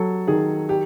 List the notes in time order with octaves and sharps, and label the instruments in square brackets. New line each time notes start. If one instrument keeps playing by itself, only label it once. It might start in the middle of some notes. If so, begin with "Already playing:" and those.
Already playing: [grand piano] F#3 [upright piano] A4
[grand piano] D#3 [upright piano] G#4
[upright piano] G4